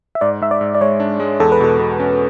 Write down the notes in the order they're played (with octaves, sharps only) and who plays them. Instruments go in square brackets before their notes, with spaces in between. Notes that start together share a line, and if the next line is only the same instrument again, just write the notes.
[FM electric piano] E5
[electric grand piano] G#2 [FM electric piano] D5
[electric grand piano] G#2 [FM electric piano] E5
[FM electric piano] D5
[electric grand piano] G#2
[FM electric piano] D5
[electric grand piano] G#3 [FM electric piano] C#5
[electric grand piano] D4
G#3
[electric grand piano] E2 [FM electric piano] A4
[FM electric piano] B4
[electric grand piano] B2 [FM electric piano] A4
[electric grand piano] B2
C#4